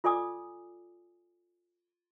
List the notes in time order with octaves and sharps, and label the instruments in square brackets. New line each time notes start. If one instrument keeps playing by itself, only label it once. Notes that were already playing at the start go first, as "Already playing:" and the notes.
[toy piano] F4 A4 D5 G#5 D6 D#6